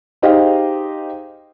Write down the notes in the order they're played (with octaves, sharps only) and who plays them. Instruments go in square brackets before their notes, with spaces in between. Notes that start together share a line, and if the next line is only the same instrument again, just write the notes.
[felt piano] D#4 G4 G#4 C5 D#5 F5